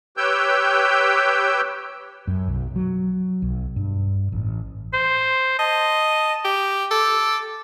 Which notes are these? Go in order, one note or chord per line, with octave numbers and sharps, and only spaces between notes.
G4 B4 C#5 G5 E6 G6
F#2
B1
F#3
B1
G2
A1
C5
D#5 A5
G4
A4 D6